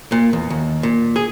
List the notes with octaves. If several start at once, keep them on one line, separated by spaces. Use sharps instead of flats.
A#2
E2
D#2
A#2
G#4